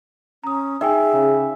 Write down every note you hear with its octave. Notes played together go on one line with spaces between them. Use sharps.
C#4 A#5 D#6
D#4 G#4 E5 G5 G#5
C#3